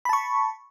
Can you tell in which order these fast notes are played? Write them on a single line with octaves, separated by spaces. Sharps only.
B5 A5 C#6